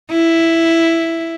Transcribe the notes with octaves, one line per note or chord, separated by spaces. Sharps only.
E4